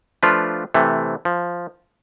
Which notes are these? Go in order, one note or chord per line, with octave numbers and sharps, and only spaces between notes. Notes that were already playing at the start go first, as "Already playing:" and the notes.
F3 A3 D4 F4 B4
C3 E3 A3
F3